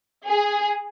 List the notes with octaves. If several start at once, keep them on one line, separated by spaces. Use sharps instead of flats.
G#4